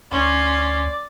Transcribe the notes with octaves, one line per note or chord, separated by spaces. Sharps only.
D2 C#4 D5 C6